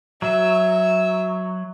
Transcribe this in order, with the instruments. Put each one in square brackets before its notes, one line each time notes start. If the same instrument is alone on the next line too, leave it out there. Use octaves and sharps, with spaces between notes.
[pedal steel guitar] F#3 [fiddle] E5